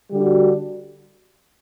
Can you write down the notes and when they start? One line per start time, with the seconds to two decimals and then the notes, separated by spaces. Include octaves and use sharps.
0.10 D3 G3 D4 F#4